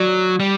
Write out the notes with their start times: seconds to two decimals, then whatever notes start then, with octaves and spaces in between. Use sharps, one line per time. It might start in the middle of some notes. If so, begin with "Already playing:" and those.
Already playing: F#3 D5
0.40 G3